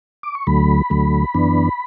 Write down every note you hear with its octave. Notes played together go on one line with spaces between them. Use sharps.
D6
C#6
D2 D3 F#3 A3 B5
D2 D3 F#3 A3
F#2 E3 B3 D4